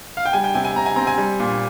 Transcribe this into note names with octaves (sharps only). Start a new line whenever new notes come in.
F5
G5
G3 G#5
G5
C3 G#5
G#5
C3 A#5
G#5
C4 A#5
G#5
G3
A#2